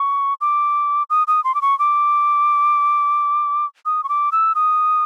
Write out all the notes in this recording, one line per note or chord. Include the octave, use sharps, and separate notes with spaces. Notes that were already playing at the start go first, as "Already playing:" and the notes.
Already playing: C#6
D6
D#6
D#6
C6
D6
C#6
D6
D#6
C#6
D6
E6
D#6